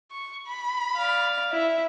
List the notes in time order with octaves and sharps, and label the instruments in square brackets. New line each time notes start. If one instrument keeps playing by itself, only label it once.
[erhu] C#6
B5
[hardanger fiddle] D5 F5
[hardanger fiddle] E4 [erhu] E5